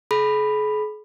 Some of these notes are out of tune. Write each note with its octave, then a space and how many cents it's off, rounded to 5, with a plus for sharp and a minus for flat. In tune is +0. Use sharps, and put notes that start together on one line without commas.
G#4 +45 B5 +0